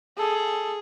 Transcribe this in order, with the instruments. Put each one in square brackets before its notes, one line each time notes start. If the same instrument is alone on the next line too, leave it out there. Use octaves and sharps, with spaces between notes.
[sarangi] G#4 [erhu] A4